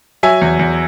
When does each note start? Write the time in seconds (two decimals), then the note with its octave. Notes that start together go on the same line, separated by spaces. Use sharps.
0.23 F#3 E5 G#5
0.41 E2
0.59 E2